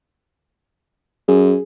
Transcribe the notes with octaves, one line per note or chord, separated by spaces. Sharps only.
F#2 G#4